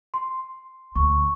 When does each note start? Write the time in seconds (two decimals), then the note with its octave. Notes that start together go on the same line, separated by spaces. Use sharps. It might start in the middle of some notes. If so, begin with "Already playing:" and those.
0.14 C6
0.95 D2 C#6